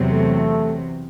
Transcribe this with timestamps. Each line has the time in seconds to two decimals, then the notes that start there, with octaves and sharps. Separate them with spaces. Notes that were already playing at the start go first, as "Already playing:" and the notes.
Already playing: E2 C3 F#3
0.11 A3